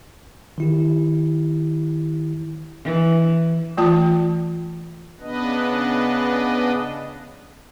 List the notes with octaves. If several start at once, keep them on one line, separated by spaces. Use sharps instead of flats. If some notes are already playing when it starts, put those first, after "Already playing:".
D#3 E4 G4
E3
E3 A3 F4 A5
C#3 B3 D4 B4 D#5